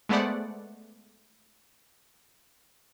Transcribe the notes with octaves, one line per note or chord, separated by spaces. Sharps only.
G#3 A3 B3 C5 D5 F#5